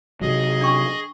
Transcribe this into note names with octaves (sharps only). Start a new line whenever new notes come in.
C3 F#3 G#4 D#5
D4 G5 C#6